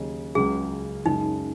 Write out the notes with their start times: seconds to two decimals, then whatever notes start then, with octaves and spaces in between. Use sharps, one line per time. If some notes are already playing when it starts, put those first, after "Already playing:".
Already playing: D#2 C#3 F#3 D#4 G#4
0.35 C#2 C#3 F#3 C#4 G#4
1.05 F#2 C#3 G#3 D#4